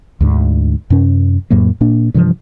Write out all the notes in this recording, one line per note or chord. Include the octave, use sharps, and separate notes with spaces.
D2 G#2 D3
F#2 C3 C#4
F2 A2 F#3 A#3
A#2 A#3 D4
G2 C3 E3 F3